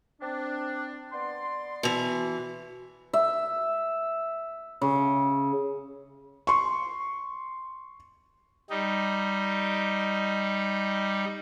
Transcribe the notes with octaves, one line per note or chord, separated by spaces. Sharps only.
C4 D4
B3 D5 C6
B2 E3
E5
C#3
C6 C#6
G3 D#4